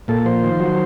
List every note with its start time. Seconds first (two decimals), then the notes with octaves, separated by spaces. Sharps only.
0.08 A#2 A4
0.25 F3 C5
0.44 D#3
0.60 F#3